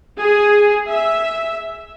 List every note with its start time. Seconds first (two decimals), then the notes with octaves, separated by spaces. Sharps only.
0.19 G#4
0.88 E5